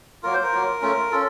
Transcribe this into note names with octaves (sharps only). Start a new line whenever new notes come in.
F#3 A#3 F4 A#4
C5
A#4
F#3 A#3 F4
A3 C#4 F4
C#4 F4 A4